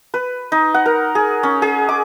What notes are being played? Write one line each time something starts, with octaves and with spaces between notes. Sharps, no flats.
B4
D#4
F#5
A#4
G#4
C#4
G#4
D6